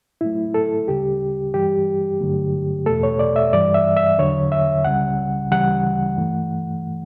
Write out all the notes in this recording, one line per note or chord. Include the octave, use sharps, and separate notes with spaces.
A2 F#3 A3 E4
A4
D2 C#3 G3 G4
G2 E3 G3 G4
G2 D3 F#3 A3
E2 B2 A3 A4
C#5
D5
E5
G2 E3 G3 D5
E5
E5
E2 D3 F#3 C#5
E5
C#2 C#3 G3 F#5
D2 C#3 E3 G3 F#5
G2 E3 A3